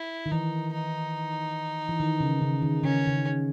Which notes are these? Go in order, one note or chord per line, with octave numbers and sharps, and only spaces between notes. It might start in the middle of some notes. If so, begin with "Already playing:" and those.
Already playing: E4
D#3
E3 D#4
D#4
E3
D#3
C#3
C#3
D#3
C#3 C#4
C#3